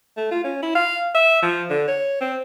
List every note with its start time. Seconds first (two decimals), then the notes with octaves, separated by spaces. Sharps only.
0.17 A3
0.31 F4
0.44 C#4
0.62 E4
0.75 F5
1.15 E5
1.43 F3
1.70 D3
1.88 C#5
2.21 C4